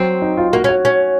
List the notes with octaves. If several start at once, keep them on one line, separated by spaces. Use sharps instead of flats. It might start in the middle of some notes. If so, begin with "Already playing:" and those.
Already playing: F#3 C4
D#4
F4
A#3 F#4
C#4
F#4
C#4